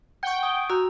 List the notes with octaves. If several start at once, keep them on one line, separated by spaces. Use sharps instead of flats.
F#5 G5 C#6
G#5 C#6 D#6
F#4 A#5 E6